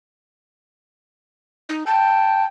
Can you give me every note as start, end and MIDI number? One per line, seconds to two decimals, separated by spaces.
1.69 1.84 63
1.87 2.48 79
1.87 2.45 81